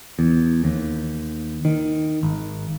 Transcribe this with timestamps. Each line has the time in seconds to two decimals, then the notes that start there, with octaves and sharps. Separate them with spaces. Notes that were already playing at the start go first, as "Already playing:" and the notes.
0.19 E2
0.64 D#2
1.65 D#3
2.23 G#1